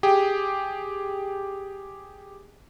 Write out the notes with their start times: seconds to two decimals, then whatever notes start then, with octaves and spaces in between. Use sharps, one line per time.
0.03 G4 G#4 G5